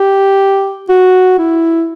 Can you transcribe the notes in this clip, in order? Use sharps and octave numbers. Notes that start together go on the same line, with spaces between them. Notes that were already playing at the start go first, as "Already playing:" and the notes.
Already playing: G4
F#4
E4